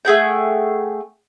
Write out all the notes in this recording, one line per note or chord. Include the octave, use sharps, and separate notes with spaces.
A3 G#4 F#5 G5